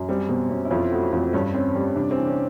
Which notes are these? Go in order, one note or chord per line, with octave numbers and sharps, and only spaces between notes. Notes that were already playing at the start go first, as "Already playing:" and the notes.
Already playing: F#2
G3 C4
B2 C4
B2 C#4
E4
F2 F4
A3 F#4
F2 C4
G2 C#4
C4 C#4
G3
C3 D4
C4
E3
C#4